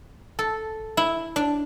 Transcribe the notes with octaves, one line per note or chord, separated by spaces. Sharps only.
A4
E4
D4